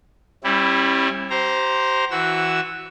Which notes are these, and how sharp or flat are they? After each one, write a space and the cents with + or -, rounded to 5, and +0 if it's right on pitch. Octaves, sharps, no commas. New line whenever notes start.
G3 +0 C#4 -45 E4 +0
G4 -35 C5 +0 A#5 +5
E3 -10 F#4 +0 E6 +0